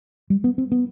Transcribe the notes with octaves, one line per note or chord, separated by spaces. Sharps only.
G3
B3
C4
B3